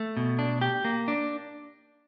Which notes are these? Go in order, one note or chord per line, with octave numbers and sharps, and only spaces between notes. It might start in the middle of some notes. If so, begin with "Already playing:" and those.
Already playing: A3
B2
D4
G4
A#3
D4